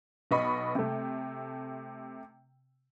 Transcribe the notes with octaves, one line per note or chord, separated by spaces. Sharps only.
B1 B3 D#5 B5 C#6
C3 A3